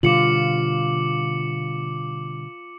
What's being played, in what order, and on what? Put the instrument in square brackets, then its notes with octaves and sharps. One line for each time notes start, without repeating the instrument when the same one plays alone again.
[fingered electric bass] B2 D3 G3 [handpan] F4 [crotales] D6 C#7 F#7